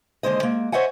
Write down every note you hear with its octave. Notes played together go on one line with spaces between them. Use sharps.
D#2 D3 G#3 C5 D#5
G#3 A#3
C5 C#5 D#5 E5 F#5 G#5